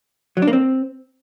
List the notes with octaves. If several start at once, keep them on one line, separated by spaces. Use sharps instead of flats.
F#3
D4
A#3
C4